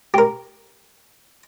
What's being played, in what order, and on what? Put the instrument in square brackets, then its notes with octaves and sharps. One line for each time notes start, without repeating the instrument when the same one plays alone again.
[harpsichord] G4 A#4